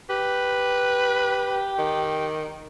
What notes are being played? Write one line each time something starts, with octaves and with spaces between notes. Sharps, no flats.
G4 B4
D#3